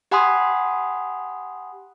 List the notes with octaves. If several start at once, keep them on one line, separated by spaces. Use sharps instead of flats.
G4 F#5 G#5 B5 C6 D#6